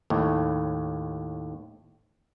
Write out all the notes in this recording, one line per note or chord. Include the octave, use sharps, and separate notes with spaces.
D#2 A2